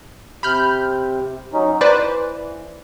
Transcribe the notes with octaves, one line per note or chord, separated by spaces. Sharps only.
C3 B5 F6 G6
F#3 C#4 D#4
E3 B4 C5 D5